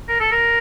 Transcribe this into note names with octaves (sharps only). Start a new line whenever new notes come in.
A#4
A4
A#4